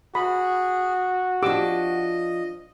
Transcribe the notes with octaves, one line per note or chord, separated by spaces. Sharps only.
F#4 G#4 B5
F3 D4 G4 D#5 D6 E6